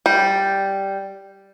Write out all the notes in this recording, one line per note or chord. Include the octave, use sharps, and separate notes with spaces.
G3